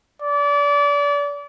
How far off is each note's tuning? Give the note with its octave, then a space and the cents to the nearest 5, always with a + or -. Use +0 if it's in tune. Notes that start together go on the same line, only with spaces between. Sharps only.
D5 -30